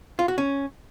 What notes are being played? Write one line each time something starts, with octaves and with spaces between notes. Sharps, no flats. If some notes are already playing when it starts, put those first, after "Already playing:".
F4
F#4
C#4